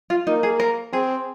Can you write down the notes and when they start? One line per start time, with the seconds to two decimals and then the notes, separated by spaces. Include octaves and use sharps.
0.10 F4
0.27 A#3 D#4
0.43 G#4
0.60 A#4
0.93 C4 G#4